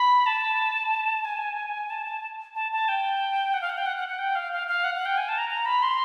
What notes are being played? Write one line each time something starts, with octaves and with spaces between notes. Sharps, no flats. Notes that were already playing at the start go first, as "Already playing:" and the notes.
Already playing: B5
A5
G#5
A5
A5
A5
G5
F#5
F5
F#5
G5
F#5
F#5
F#5
G5
F5
F5
F5
F#5
F#5
G5
G#5
A5
A#5
A#5
B5
C6